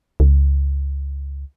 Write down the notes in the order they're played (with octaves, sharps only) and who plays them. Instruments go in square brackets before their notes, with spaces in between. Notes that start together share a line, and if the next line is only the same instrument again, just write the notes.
[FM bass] C#2